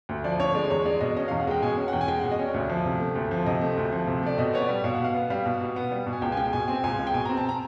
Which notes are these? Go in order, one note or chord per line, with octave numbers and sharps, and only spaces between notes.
D2
F3 D5
D3 C#5
G#3 D5
E2 C#5
G#3 D5
B2 D#5
C#4 D#5
F5
E2
F#5
G#3 G5
B2 G#5
C#4
F#5
E2 G5
G#5
G#3 G5
F#5
B2
D#5
C#4 D5
D2
F3
C3
A3
D2
F3
C3 D#5
A3
D2
F3
C3
A3 D5
B2 D#5
B3 C#5
D5
G3
B2 F5
F#5
B2 F5
B3
G3 F5
B2
B2
B3
G3
B2
G#5
C#2 G5
G#5
G#3 G5
B2 G#5
C4 G#5
G5
C#2 G#5
G#3
G5
B2 G#5
A#5
C4
A5
A#5